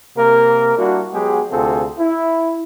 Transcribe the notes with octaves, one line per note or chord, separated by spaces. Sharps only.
C3 A#3 A#4
G3 A#3 D4 E4 F#4
F#3 G#3 B3 G4 G#4
D2 C3 C4 F4 G#4 A4
E4